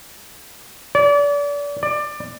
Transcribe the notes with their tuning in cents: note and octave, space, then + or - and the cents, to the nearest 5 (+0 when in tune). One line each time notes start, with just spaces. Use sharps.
D5 -35
D5 +20